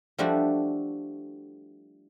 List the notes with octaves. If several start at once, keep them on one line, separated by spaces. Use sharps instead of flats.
F3 G3 A3 D4 E4 F#4